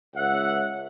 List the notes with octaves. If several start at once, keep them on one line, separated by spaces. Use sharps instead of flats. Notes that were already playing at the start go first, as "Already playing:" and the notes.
C#2 E5 F#5